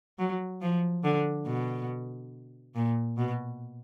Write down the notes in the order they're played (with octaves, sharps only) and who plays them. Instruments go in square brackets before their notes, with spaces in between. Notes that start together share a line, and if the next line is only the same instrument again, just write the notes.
[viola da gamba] F#3
F3
D3
B2
A#2
B2